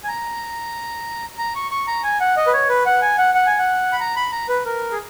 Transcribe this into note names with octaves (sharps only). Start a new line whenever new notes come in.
G#5
A#5
A#5
C#6
C#6
A#5
G#5
F#5
D#5
B4
C#5
B4
F#5
G#5
F#5
F#5
G#5
F#5
B5
A#5
B5
A#5
B4
A#4
G#4